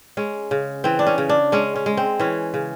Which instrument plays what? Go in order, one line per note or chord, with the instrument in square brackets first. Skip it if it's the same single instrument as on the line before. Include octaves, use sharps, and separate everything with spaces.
[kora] G#3 C#4
C#3
E3 C4
D4
C#4
C#3
D4
G#3 C#4
C#4
G#3
C4
E3 C#4
C#3